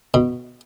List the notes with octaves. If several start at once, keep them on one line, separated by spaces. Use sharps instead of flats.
B2